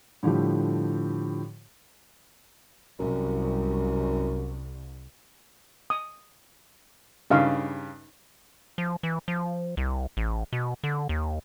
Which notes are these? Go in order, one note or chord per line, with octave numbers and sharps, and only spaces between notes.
A2 D3 F3 G3 G4
C2 F#2
D#6
G2 C#3 D#4 F5
F3
E3
F3
C2
A1
B2
D3
D#2